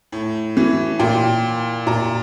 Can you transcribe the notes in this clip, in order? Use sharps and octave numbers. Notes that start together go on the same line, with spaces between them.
A2
E3
A#2 G5
A#2 A#5